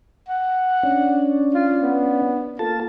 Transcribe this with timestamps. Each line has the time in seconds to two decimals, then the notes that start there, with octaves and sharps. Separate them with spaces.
0.28 F#5
0.83 C#4 D4
1.54 F4
1.82 B3
2.59 A#3 F4 A4 A5